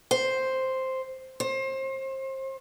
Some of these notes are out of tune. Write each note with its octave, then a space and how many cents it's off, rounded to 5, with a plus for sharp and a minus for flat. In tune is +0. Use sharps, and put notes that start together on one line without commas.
C5 +0
C5 +30